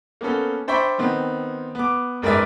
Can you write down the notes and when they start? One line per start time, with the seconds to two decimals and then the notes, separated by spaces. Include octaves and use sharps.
0.21 A#3 B3 C#4 A4
0.68 D4 C5 E5 G5 B5 C#6
0.98 D#3 B3 C4
1.75 B3 D6
2.22 F#1 G#2 A#4 B4 D5 E5